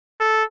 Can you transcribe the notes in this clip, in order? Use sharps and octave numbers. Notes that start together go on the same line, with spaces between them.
A4